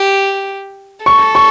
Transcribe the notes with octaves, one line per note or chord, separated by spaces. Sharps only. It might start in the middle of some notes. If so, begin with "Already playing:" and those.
Already playing: G4
A4 C#6
C#6